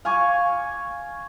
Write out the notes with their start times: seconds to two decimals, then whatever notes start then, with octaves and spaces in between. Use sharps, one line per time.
0.05 F5 G#5 C#6 D6